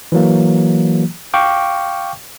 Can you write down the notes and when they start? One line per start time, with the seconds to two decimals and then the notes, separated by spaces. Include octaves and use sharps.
0.12 E3 F#3 A#3
1.34 F5 G5 C#6 D6